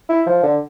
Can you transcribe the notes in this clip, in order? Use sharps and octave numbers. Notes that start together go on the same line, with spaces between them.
E4
F3
D3